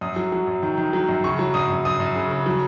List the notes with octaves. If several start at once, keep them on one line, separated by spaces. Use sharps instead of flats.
F#2 D#6
F#3
F#3
F#2
D#3
D#3
F#3
F#2
C#3 C#6
F#3
F#2 D#6
F#2
F#2 D#6
F#2
C#3
C#3
F#3